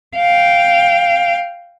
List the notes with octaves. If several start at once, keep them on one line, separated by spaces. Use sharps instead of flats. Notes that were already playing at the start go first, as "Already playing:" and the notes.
F5 G5